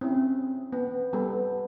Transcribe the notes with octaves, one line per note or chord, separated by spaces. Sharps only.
C4 C#4 E4
B3
G3 B3 A4